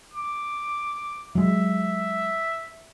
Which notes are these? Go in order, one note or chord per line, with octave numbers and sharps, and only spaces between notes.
D6
F#3 G#3 E5